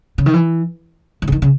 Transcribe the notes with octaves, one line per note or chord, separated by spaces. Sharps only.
C#3
D#3
E3
E3
C#3
D#3
C#3